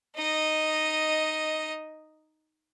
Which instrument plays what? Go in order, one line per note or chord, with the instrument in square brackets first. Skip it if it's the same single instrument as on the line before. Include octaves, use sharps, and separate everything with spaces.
[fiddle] D#4 D#5